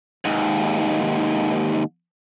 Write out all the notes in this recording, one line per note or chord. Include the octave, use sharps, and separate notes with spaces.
D#2 G#2